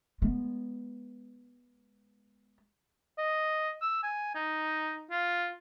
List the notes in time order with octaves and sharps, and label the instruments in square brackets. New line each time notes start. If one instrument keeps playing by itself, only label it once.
[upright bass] G#3 B3
[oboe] D#5
E6
G#5
D#4
F4